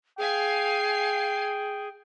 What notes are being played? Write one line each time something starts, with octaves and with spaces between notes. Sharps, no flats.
G#4 F5 G5 G#5 C7